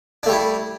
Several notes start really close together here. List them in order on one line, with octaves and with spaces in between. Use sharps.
D4 A3 G3 E4